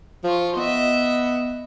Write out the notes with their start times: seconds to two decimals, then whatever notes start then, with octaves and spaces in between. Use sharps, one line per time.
0.24 F3 F4 C#6
0.56 B3 D#5 E5